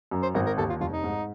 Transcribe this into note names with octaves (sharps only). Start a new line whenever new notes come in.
F#2
C5
G#1 A#4
A#4
D#2 A4
F4
F1 F4
D#4
G#2